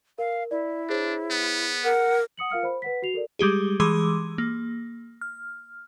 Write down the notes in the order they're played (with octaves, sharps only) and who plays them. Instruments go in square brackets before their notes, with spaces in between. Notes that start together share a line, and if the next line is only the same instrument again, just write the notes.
[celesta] A#4 [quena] F5
[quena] E4 [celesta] D5
[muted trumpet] D4 [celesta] G#4 C5 C#5
[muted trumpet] B3
[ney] A#4 [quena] F#5
[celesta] F#5 D#6 C#7 F#7
F4 A#4 F5 F6 C#7
C5 B5
B4 F#5 B6
F#4 C7 F7
A4 A#4 D5
[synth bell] G3 G#3 G4 G#4
E3 G#3 G#4 C6 D6 E6
A#3
F6